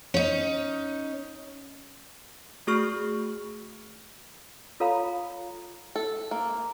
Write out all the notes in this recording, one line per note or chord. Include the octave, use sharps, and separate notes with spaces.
C#4 D#4
A3 F#4 G#4 C#6 F6
F4 A4 C#5 F5 A#5 B5
A4
A#3